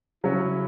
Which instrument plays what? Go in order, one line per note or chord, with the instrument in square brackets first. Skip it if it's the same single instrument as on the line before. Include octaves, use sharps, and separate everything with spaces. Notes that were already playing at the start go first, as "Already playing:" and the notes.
[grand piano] C#3 F#3 C#4 [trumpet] E4